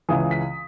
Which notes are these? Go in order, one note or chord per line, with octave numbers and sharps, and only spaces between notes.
C#2 C#3 E3 D#6
B6